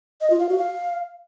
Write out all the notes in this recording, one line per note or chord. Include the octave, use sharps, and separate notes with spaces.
D#5
F4
F5
F#4
F5